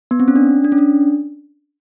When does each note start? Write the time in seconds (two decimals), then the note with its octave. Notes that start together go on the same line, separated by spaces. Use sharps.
0.11 B3
0.20 C4
0.28 C#4
0.36 D4
0.64 D4
0.72 C#4
0.78 D4